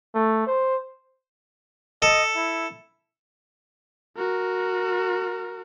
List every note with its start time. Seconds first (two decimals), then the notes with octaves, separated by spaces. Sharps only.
0.15 A3
0.47 C5
2.02 A4 D#5
2.36 E4
4.17 F#4 A#4